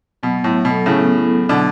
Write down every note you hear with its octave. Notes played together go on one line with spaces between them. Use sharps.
B2 F#3
B3
A2
F#3
B2
A4
A2 C#3 A4
B3
E4
F#3
B2 D3 B3